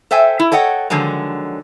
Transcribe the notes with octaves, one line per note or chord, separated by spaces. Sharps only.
A4 C5 E5 G5 G#5
E4
A4 C#5 D#5 F#5 G5
D3 D#3 F3 F#3 G#3